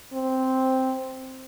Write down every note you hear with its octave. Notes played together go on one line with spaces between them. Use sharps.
C4